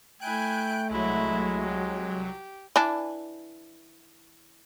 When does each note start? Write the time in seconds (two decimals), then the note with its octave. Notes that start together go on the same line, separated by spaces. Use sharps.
0.21 A3 E4 G5 G#5 F#6 G6 D7
0.90 C2 F#3 G#3 E4 F#4
1.60 G4
2.76 E3 D4